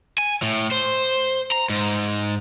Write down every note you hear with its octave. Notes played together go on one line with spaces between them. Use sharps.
G#5
A2
C5
A#5
G#2